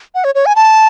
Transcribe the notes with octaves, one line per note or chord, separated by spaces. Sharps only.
F#5
C#5
C#5
G#5
A5